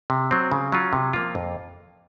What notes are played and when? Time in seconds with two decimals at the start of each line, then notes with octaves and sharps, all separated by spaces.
0.10 C3
0.31 F#3 C4
0.52 C#3
0.72 F#3 C#4 F4
0.93 C3
1.13 F3 A#3 F4
1.35 F2